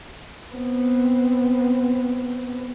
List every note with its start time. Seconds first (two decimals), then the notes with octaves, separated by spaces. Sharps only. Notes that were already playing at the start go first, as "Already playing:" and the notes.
0.54 B3 C4